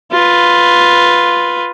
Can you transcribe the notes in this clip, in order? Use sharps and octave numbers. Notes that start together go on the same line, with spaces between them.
F4 B4